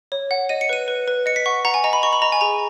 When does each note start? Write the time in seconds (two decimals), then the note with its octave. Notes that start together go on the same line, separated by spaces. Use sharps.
0.12 C#5
0.31 F#5
0.49 D#5 D#7
0.61 C#7
0.69 B4 D#7
0.88 B4
1.08 B4
1.26 D#5 C#7
1.36 B6
1.46 F#5 C#6
1.65 F#5 A#5
1.74 G#5
1.84 D#5 A#5
1.93 B5
2.03 D#5 C#6
2.13 B5
2.22 D#5 A#5
2.32 G#5
2.41 G#4 A#5